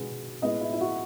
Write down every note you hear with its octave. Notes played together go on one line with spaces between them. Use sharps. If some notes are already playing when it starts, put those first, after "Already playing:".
Already playing: B2 G#3 B3
A2 G#3 B3 D#5
E4
E4
F#4